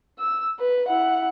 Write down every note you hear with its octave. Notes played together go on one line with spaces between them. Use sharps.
E6
B4
E4 F#5